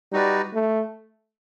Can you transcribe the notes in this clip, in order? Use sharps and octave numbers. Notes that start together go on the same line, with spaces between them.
G3 D#4 F#4 B4 D5
A3